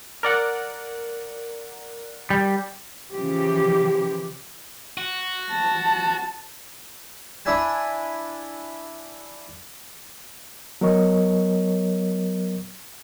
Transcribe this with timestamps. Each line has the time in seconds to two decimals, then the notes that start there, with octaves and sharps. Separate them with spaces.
0.23 A#4 D5 F#5
2.30 G3
3.13 C#3 E3 F3 G4
4.98 F#4
5.51 A5
7.45 D4 E4 D5 E5 G#5 A5
10.81 F#3 B3 A#4 C#5 D#5 C#6